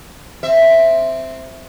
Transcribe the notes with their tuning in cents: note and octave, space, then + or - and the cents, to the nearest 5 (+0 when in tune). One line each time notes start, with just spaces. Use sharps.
C4 +0 E5 +0